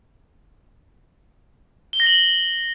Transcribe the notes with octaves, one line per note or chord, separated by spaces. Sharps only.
G7
A#6
F#7